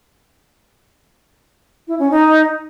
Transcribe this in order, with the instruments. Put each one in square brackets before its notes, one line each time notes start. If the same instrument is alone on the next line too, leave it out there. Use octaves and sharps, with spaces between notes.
[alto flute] E4
C#4
D#4